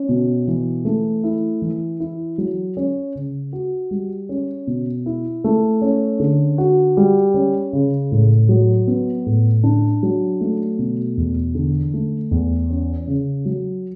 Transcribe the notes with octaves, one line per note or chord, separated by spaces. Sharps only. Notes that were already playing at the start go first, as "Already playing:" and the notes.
Already playing: C#4
B2
E3
A3
E4
E3
E4
F#3
C#4
C#3
F#4
G3
C#4
B2
E4
A3
C#4
D3
F#4
G3
C#4
C#3
A2
F#3
B3
A2
D4
F#3
A3
B2
E2
D3
A3
E2
C#4
C#3
F#3